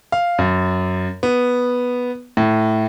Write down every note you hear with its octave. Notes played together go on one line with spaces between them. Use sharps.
F5
F#2
B3
A2